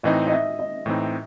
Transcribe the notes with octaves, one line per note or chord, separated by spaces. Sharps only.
A2 E3 C4 D#4 D#5
D#5
E5
D#5
A2 E3 C4 D#4